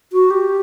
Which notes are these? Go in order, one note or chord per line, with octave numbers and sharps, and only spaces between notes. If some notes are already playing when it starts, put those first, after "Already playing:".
F#4
G4